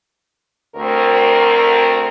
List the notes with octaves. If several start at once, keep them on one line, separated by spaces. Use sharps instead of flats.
D2 C4 A#4